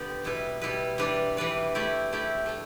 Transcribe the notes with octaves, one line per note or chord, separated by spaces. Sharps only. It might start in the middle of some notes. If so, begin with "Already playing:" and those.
Already playing: D3 B3 G4 D5
B2 G3 E4 B4
B2 G3 E4 B4
E3 G3 D4 B4 D5
E3 G3 D4 B4 D5
A3 E4 G4 D5
A3 E4 G4 D5
A3 D4